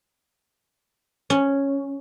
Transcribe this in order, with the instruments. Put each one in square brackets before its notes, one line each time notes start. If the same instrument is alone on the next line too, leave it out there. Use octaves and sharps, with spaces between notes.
[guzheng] C#4